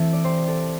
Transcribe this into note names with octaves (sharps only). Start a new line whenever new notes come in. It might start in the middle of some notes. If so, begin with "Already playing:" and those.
Already playing: E3 A3 C4 E4 A4
D5
G4 C5
A4 D5